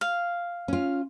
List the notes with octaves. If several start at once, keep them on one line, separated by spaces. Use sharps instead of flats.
F5
C#4 F4